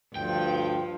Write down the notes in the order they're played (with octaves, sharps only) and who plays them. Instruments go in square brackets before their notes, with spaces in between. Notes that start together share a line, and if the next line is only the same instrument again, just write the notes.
[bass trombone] D2 [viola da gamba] G2 F3 [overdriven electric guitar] G5